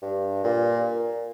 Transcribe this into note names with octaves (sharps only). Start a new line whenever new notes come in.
G2
A#2